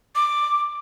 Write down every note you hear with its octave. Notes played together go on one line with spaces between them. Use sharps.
D6